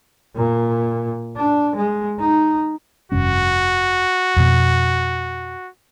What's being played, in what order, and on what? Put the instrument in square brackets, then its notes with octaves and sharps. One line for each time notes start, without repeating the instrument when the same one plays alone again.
[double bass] A#2
D4
G#3
D#4
[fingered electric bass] F1 G2 C#4 [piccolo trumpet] F#4
[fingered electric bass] F2 B2